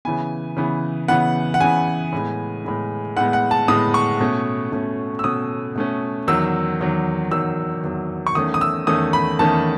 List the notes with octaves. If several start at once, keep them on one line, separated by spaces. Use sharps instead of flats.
C#3 E3 B3 G#5
C#3 E3 B3
C#3 E3 B3 F#5
F#5
C#3 E3 B3 G#5
A2 G#3 B3
A2 G#3 B3
A2 G#3 B3 F#5
F#5
A5
A2 G#3 B3 D#6
C#6
B2 A3 C#4
B2 A3 C#4
E6
B2 A3 C#4 D#6
B2 A3 C#4
E2 D#3 F#3 E6
E2 D#3 F#3
E2 D#3 F#3 E6
E2 D#3 F#3
C#6
E2 D#3 A3 C#4 D#6
D#6
E6
E2 D#3 A3 C#4 D#6
B5
E2 D#3 A3 C#4 A5